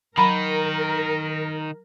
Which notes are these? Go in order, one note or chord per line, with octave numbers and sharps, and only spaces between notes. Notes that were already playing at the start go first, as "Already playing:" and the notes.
D#3 F#3 D#4 A#4 A#5 B5